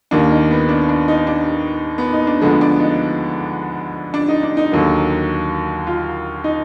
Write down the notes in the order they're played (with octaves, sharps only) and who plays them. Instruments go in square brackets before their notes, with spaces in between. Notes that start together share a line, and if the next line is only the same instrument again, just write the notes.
[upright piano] D#2 D#3 A#3 D4
D#4
B3
D4
D4
D#4
D4
B3
D#4
D4
D2 D3 F3 G#3 B3
D4
D#4
D4
D#4
D4
D#4
D#2 D3 F#3 A#3
F4
D#4